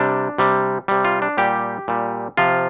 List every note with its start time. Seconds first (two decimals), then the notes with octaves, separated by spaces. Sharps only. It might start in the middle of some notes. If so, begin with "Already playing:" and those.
Already playing: C3 G3 D4
0.38 C3 G3
0.88 C3 G3
1.05 F4
1.22 D4
1.38 A#2 G3 G4
1.88 A#2 G3
2.37 C3 F3 F4